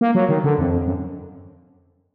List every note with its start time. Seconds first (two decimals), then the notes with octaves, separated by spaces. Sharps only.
0.01 A#3
0.15 F#3
0.29 D#3
0.44 D3
0.58 F2
0.86 F#2